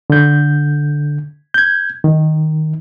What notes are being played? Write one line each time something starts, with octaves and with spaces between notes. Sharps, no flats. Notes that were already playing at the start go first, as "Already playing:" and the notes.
D3 G6
G6 G#6
D#3